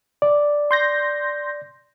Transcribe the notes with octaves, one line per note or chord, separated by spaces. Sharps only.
D5
C6 G6 A#6